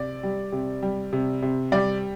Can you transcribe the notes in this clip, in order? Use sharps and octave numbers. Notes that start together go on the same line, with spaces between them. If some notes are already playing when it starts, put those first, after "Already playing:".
Already playing: C3 D5
G3
C3
G3
C3
C3
G3 D5